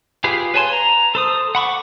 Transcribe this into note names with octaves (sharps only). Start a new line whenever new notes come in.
F4 G4 G#4 B4 F5
B4 C#5 G#5 A5 C6
A#5
A4 C5 D#6
F#5 B5 C#6 D6